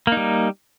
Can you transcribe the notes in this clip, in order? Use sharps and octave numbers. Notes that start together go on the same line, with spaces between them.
G3 A#3 D#4